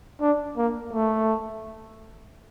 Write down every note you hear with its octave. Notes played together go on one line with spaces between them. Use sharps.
D4
A#3
A3